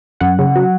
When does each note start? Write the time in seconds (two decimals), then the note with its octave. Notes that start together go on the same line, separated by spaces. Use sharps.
0.20 F#2 F#5
0.39 C#3
0.56 F#3